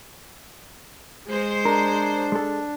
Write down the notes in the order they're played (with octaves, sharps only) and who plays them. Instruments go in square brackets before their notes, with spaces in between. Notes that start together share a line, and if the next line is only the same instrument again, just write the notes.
[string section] G#3 C5
[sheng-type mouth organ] D4 [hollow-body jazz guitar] A#4
[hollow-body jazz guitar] G#3 A4